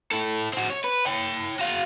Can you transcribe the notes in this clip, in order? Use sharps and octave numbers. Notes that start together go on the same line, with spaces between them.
E4 A4
C4 F#4
C#5
B4
C#5 G5
F#4 F5